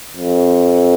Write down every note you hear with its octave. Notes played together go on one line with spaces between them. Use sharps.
F2